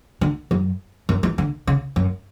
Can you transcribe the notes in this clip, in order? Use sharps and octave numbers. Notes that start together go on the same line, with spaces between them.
D3
F#2
F#2
E3
D3
C#3
F#2